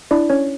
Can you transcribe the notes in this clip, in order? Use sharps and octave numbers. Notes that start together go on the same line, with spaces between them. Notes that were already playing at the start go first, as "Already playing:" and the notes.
D4 E4 D5
C#4 C#5